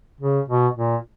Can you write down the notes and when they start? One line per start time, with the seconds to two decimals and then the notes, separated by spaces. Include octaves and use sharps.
0.21 C#3
0.48 B2
0.76 A#2